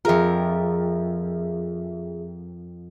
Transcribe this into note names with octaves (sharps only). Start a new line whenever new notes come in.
F2 F4 G#4 A#4 E5